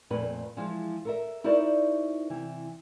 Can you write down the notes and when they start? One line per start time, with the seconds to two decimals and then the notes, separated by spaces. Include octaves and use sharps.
0.10 F2 A#2 A3 B4
0.57 E3 F3 G#3 F4
1.05 A4 A#4 E5
1.44 D#4 E4 F#4 A#4 C5 D5
2.30 C3 E3